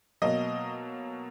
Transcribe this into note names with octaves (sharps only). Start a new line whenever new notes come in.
B2 F#3 A#3 D#5